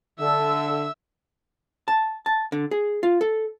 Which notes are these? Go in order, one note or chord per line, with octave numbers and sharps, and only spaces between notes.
D3 A4 E5 E6
A5
A5
D3
G#4
F4
A4